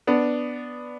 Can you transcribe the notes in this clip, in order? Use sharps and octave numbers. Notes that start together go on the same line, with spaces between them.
B3 D4